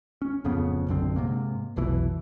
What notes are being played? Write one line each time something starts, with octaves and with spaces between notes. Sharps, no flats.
C#4
D1 F2 C#3 B3
A#1 F#2 D3 C4
G#2 C3 A#3
F1 B1 B2 E3